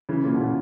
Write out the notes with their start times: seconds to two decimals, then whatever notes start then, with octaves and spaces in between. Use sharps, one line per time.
0.09 C#3 E3
0.24 A#2 C#3
0.34 B2
0.40 A#2 C#3